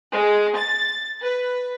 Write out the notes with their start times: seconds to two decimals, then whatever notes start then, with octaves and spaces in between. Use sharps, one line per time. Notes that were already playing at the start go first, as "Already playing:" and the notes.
0.12 G#3
0.57 A6
1.22 B4